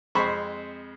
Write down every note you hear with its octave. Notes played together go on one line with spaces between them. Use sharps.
F2 G#3 C4 C5 B5 C#6